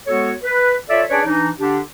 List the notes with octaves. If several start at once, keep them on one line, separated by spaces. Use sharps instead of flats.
G#3 B3 F#4 A4 C#5
B4
F4 A4 C#5 D5 E5
C#4 D4 G#4 B4 C#5 D5
E3 D4 D#4
D3 D4 G4